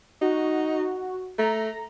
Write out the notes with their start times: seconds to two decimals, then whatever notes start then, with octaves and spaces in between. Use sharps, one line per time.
0.22 D#4 F#4
1.38 A3 A#5